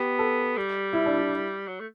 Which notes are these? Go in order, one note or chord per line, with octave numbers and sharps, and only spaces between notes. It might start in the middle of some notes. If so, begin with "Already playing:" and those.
Already playing: B3 G4
A4
G3
E4
D4
E4
F#3
A3